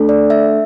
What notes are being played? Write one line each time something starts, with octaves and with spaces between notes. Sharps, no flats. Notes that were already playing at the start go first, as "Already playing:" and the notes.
Already playing: A3 D4 A4
D5
E5